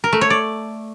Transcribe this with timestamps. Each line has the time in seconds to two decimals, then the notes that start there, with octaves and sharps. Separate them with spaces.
0.04 A#4
0.13 A3
0.21 C#5
0.30 D5